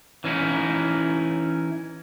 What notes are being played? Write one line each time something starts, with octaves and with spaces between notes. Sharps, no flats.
E3 C#4 D#4 E4